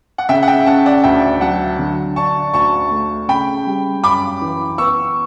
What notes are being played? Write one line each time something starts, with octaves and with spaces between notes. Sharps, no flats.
F#5
C#3 E5 G5
F#5
E5 G5
C#4 F#5 A5
D5 F#5
D2 E5 G5
F#3 F#5 A5
D3
D4 A5 C#6
D2 A5 C#6
A3
C#3 G5 B5
G3
F#2 B5 D6
E3
B3 C#6 E6